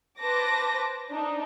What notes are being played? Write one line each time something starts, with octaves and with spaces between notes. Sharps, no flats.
B4 C5 A5 D6 A#6
D4 D#4